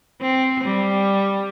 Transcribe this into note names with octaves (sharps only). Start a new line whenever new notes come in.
C4
G3